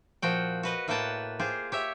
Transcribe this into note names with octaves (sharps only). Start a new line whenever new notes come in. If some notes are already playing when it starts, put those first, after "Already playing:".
A#2 F3 F#4 G5
F#4 B4 D#5
A2 A#3 F#4 B4 G5 A5
F4 G4 G#4 C5
G4 C#5 E5